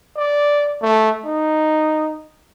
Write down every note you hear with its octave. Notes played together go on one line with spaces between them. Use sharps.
D5
A3
D#4